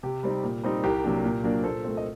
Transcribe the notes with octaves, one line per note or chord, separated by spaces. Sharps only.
C3 G4
G3 C4 D#4
A#2
G3 C4 D#4
C2 G4 A#4
C3 F#3 A#3 D4
A#2
F#3 A#3 D4
A#2 A4 C5
A3 C4
D#5